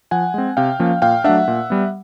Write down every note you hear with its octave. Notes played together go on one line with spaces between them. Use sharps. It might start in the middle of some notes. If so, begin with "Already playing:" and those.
F3 F#5 G#5
G#3 C4
C3 F5 G5
F3 A#3 C#4
A#2 F5 G5
F#3 A3 D4 E5 F#5
A#2
G3 B3